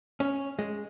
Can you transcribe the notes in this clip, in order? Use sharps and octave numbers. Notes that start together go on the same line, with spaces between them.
C#4
G#3